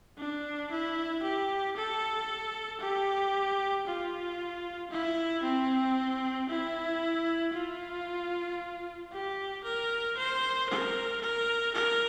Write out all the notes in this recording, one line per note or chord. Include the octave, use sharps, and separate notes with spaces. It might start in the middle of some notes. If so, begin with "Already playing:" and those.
D4
E4
G4
A4
G4
F4
E4
C4
E4
F4
G4
A#4
C5
A#4
A#4
A#4